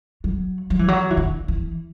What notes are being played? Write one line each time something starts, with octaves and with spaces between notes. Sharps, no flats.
F#3
F#3
E3
F#3
E3
D3
E3